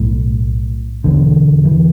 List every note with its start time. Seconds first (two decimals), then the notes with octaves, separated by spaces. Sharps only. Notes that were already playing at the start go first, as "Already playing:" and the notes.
Already playing: B1 A2
1.04 E1 E2 D3
1.65 E3